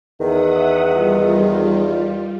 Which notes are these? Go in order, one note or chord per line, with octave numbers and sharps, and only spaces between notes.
E2 D#3 E5 F#5 D#6
G3 F4